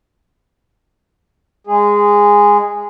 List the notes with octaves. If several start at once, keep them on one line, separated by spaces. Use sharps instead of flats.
G#3 G#4